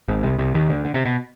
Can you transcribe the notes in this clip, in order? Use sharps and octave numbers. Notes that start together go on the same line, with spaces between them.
G#1 G#2
C2 C3
C2 C3
D#2 D#3
D2 D3
D3
C3
B2